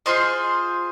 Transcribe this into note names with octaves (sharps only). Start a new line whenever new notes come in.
F4 G#4 C5 D#5